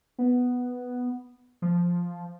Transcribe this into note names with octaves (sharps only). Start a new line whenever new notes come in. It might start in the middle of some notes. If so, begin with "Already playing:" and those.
B3
F3